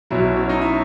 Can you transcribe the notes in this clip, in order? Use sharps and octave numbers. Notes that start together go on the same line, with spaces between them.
B1 B2 F#3 E4
C#4
D#4
E4